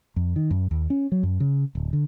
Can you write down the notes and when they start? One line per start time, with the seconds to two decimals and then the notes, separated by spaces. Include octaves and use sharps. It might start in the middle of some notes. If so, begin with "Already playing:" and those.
0.16 F2
0.36 D#3
0.51 F#2
0.71 D#2
0.90 C#4
1.12 F#3
1.23 F#2
1.40 C#3
1.75 D1
1.93 D3